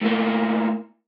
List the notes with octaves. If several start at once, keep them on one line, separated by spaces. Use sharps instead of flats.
A2 A#3